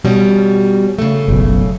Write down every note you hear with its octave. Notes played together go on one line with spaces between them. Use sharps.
B2 G3 C#4
C#3 A3
F#1 B1